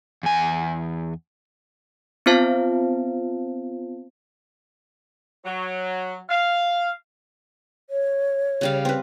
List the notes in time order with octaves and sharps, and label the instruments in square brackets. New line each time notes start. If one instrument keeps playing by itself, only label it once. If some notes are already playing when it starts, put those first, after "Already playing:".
[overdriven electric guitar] E2 G#5
[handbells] B3 C4 F4 C5 F5 A5
[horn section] F#3
F5
[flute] C#5
[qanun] C#3 G3 F5
C4 B4